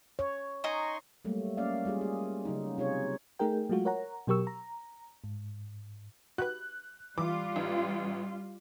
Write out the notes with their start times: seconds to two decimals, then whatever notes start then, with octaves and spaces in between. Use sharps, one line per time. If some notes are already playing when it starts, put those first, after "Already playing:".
0.19 C#5
0.64 D#4 D#5 G#5 A#5 C6 C#6
1.25 F#3 G3 A3 A#3
1.57 A#3 C#4 D5 F5
1.85 G3 G#3 F4 G#4
2.01 G#4
2.45 C#3 F#3 D#4
2.78 C3 D#4 F4 G#4 C#5
3.39 A3 D#4 G#4 A#4 G5
3.69 F#3 G#3 A3 F4 F#4
3.85 A#4 C#5 F#5 A#5
4.27 B2 F#3 G4 A#4 C#6 E6
4.47 A#5
5.24 G#2
6.38 F#4 G4 B4 F#6
7.18 E3 G3 F4 D6
7.56 A1